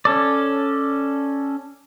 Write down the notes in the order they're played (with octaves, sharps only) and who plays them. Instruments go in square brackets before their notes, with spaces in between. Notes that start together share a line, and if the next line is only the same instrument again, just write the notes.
[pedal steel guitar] C#4 A4 D5